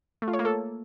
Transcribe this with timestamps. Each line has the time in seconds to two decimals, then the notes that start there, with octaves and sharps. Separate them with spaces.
0.22 A3
0.28 F4
0.33 C#5
0.39 A#3
0.45 A4